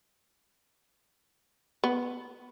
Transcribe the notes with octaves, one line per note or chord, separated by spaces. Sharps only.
B3